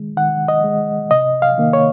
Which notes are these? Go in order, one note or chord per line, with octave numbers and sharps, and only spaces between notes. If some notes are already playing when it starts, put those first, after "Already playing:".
Already playing: D#3 G#3
D#3 F#5
D#5
G#3
C3 D#5
F5
D#3 A#3
C#5